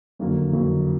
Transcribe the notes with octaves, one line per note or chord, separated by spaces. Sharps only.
F#1 F2 D3 F#3 A#3
F#1 F2 D3 F#3 A#3